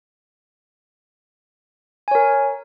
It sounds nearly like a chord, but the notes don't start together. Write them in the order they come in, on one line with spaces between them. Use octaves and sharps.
G#5 C#5 A#4